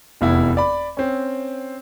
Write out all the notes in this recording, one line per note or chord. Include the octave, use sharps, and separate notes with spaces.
F1 E2 E4
D5 B5
C4 C#4